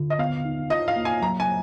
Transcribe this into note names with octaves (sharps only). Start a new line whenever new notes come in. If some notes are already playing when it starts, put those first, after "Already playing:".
Already playing: D3 F4
D#5
B3 F5
D#4
F4 D#5
F5
A#3
G#5
F#3 A#5
G#5